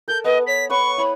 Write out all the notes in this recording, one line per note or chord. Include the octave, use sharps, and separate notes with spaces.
A4 A#4 G6
B3 B4 D#5
C#5 B6
B4 C#5 F#5 B5 C#6
E4 C#5 B5